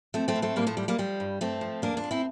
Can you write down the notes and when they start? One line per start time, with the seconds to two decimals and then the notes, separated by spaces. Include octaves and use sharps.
0.14 F3 A3 C4
0.28 A3 C4
0.36 A2
0.42 A3 C4
0.56 A2 G3 A#3
0.67 F3 A3
0.77 F3 G3
0.88 G3 A#3
0.98 F3 G3
1.20 G2
1.41 G2 A3 C4
1.61 F3
1.82 E2 A#3 D4
1.97 D4 F4
2.04 E2
2.11 C4 E4